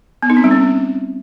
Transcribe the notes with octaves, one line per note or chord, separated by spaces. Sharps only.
B3
D#4
C4
G3
C#4